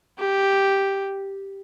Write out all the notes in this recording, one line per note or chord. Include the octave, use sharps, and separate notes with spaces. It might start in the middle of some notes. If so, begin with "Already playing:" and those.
G4